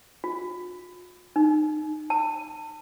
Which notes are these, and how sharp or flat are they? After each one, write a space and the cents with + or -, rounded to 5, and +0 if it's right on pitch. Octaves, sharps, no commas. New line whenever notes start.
F4 +40
D#4 -20
A5 +35